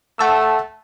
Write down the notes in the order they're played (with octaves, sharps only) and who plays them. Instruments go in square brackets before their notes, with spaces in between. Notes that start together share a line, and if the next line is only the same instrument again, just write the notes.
[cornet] A3 [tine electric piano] F#5 A5 E6